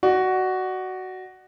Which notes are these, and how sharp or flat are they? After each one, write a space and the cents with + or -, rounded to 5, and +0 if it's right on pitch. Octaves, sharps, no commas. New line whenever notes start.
F#4 +10 D5 +30